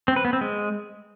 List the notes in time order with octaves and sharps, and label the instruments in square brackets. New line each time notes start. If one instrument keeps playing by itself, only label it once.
[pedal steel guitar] C4
B4
B3
C4
G#3